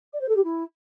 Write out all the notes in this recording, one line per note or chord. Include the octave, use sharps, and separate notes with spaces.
D5
C5
A4
G4
E4